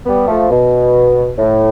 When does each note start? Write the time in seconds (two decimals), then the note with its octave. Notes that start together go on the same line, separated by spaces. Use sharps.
0.06 G3 B3
0.28 F3 A3
0.50 B2
1.39 A2